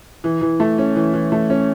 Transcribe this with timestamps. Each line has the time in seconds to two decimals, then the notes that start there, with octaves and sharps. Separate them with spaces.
0.24 E3
0.41 E3
0.60 A3
0.78 C#4
0.96 E3
1.13 E3
1.32 A3
1.50 C#4